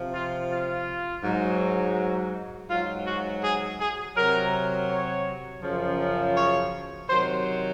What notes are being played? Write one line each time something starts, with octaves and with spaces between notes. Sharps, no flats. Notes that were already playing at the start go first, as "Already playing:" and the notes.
Already playing: C3 F3
F4
F4
G#2 F#3
G#2 F#3 F4
F#4
G#4
G#4
C3 F#3 A#4
C#5
F#2 C#3 F3
C#5
C3 D#3 F#3 C5